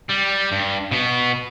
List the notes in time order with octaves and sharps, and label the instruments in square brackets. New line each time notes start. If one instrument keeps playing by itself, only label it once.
[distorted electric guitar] G3
G2
B2 B3